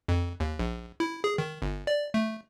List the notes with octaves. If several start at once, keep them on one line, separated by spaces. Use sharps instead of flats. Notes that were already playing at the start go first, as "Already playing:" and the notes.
F2
D#2
A#1
E4
G#4
D#3
G1
D5
A3